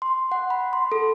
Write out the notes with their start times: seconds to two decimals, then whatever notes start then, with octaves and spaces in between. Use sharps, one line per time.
0.02 C6
0.32 F#5
0.50 B5
0.73 C6
0.92 A4